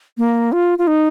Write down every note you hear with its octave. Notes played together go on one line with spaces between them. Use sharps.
A#3
F4
F4
D#4